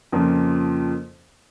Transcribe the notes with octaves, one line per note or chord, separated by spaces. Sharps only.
F2 C#3 F3 A#3